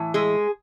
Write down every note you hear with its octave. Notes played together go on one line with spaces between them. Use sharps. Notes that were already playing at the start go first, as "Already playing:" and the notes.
Already playing: A2 E3
G#3 G#4